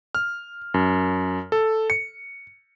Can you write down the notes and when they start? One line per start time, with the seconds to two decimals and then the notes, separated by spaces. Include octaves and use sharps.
0.15 F6
0.74 F#2
1.52 A4
1.90 C#7